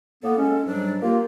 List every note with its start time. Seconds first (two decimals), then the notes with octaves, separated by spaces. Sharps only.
0.23 A2 A#3 B3 A4
0.37 G#3 C#4
0.66 G#2 F#3 G3 D4
1.02 A#3 F4 G4